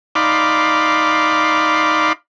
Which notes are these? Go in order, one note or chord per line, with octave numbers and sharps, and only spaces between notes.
D#4 D5 F5 B5 C6 D6